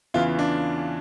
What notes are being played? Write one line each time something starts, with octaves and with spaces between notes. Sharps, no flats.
E2 C#3 E3 F4
D4